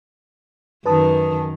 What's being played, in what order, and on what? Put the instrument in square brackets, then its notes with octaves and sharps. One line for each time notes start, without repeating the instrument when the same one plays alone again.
[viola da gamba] F#2 D#3 [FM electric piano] B4 A5 D#6